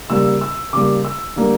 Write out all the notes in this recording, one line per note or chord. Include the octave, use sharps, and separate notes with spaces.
C#3 G3 A#3 E6
E6
C#3 G3 A#3 D6
E6
D3 G3 A#3